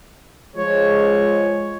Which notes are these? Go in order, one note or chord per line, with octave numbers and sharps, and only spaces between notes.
F3 G#3 C#5